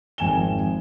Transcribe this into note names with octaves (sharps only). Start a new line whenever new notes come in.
G#1 F2 G#5 E7 G7